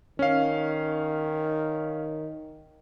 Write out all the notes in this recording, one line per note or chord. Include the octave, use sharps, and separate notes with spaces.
D#3 C#4 F5